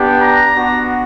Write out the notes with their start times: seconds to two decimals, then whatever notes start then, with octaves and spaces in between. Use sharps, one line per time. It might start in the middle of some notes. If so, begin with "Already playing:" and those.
Already playing: B3 D4 G4
0.22 A#5
0.54 B3 D4 F#4